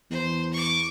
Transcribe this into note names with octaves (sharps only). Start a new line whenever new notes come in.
E2 C5
C#6 D6